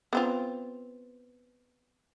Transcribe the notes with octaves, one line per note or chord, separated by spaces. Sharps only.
B3 C4 F4